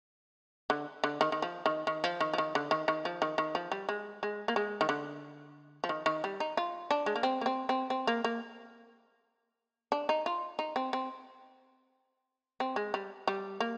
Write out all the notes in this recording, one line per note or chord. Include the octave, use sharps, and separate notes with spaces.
D3
D3
D#3
D#3
F3
D#3
D#3
F3
D#3
F3
D#3
D3
D#3
D#3
F3
D#3
D#3
F3
G3
G#3
G#3
A#3
G#3
D#3
D3
F3
D#3
D#3
G3
D#4
F4
D4
G#3
A#3
C4
A#3
C4
C4
C4
A#3
A#3
D4
D#4
F4
D#4
C4
C4
C4
G#3
G3
G3
A#3